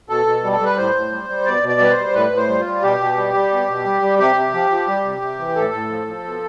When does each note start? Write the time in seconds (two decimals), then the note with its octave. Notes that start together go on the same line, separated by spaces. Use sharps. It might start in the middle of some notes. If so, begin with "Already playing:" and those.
0.09 B2 A4
0.26 B2
0.44 G3
0.52 A4
0.60 G3 B4
0.77 A2 C5
0.95 A2
1.11 G3
1.29 G3
1.46 B2 D5
1.63 B2
1.69 D5
1.80 G3 B4
1.91 C5
1.97 G3
2.14 A2 B4
2.31 A2
2.37 C5
2.48 G3
2.60 F4
2.65 G3
2.83 B2 G4
3.00 B2
3.17 G3
3.34 G3
3.51 B2
3.68 B2
3.85 G3
4.02 G3
4.19 C3 G4
4.36 C3
4.54 F3
4.71 F3
4.88 G3
5.05 C3
5.22 C3
5.39 E3
5.56 A2 A4
5.73 A2
5.90 F3
6.07 F3
6.24 B2